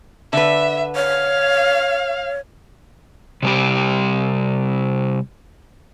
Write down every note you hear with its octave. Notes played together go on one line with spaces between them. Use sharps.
D3 B4 E5
C#5 F5
C3 G3 G4